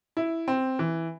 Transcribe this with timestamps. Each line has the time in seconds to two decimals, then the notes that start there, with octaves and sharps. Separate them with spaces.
0.17 E4
0.48 C4
0.79 E3